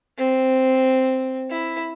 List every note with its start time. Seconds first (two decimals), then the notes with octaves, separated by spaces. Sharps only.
0.18 C4
1.50 E4